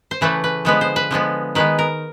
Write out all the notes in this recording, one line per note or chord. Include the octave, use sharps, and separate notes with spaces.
C5
C#3 E3 A3 B4
B4
D3 F3 G#3 B3 B4
C5
B4
D3 F3 G#3 B3
D#3 G#3 B3 B4
A#4